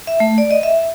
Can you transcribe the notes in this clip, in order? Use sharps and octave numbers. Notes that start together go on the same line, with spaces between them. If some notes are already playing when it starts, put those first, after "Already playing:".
E5
A3
D5
D#5
E5